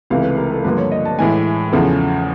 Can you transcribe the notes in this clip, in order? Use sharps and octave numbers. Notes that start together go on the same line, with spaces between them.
C#2 C3 E3 A3 F5
B4
A#4
A4
G2 D3 F3 A#3 B4
C#5
D#5
A5
A2 E3 G#3 G#5
E2 C#3 F3 A3